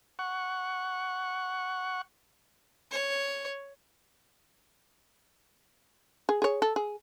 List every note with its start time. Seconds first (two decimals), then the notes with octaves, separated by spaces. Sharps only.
0.19 F#5 C#6
2.91 C#5
6.29 G#4
6.42 G#4 C#5
6.62 A4
6.76 G#4